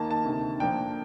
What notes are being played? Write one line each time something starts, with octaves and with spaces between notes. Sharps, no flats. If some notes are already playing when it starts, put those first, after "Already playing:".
Already playing: D#2 D#3 A#3 D#4 A5
A5
D2 C3 D#3
A#2 F3 A#3 D4 G5